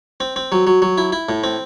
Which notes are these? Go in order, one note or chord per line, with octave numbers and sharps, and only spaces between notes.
C4
C4
F#3
F#3
F#3
E4
E4
A2
C4